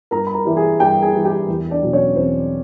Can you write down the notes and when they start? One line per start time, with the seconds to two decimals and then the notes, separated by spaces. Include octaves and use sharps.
0.11 G2 A#4 A#5
0.27 B5
0.34 A#4 A#5
0.45 E3 G3
0.57 G#4 G#5
0.80 G2 G4 G5
1.02 G#4 G#5
1.14 E3 G3
1.25 G4 G5
1.49 E2
1.70 D4 D5
1.82 B2 F#3
1.93 C#4 C#5
2.16 E2 C4 C5